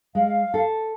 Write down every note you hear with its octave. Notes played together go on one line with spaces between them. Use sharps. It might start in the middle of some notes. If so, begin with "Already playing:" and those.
G#3 F5
A4